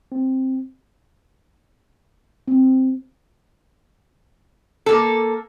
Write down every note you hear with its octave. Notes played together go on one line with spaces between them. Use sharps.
C4
C4
A#3 A4